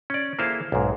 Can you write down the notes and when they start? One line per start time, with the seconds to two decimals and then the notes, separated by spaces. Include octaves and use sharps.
0.10 C#4 D5
0.39 A#3 E4 G#4 A4 C5 F5
0.72 B1 G#2